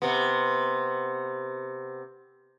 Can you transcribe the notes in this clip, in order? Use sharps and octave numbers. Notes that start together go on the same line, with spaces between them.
C3 B3